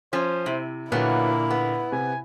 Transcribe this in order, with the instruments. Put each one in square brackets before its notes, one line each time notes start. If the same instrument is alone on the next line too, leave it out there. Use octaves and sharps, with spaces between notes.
[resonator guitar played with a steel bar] F3 C#4 [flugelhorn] C5
[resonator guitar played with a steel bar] C3 [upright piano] E4
[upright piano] A#2 D3 [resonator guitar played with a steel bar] F#3 B3 [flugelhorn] A#3 [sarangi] E4
[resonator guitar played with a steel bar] B3
[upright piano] C3 [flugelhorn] G#5